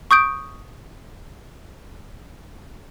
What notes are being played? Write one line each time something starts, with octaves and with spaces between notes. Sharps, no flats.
C#6 D#6 G6 D7